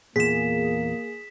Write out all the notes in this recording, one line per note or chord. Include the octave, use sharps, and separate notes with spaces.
E2 A#2 A#3 G#4 B6 E7